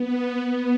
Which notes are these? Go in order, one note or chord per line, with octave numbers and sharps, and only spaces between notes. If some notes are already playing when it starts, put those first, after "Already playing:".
Already playing: B3
B3